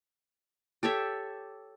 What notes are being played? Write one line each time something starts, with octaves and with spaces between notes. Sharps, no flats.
G4 A4 C#5 E5